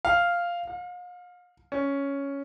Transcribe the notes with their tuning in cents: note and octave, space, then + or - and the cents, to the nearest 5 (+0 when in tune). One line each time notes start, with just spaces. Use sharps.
F5 -5
F5 +40
C#4 +5